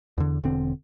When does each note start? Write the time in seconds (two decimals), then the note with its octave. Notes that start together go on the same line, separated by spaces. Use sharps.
0.18 E2 D3
0.44 E1 D3 C4